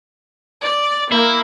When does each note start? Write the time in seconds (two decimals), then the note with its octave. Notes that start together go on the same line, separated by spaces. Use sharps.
0.62 D5
1.12 A#3 E4